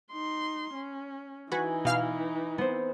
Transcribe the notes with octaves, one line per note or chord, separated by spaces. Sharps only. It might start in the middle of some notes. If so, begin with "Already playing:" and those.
D#4 C6
C#4
E3 D#4 F#4 B4 G#5 B6
B2 F5 F6
B3 C4 C5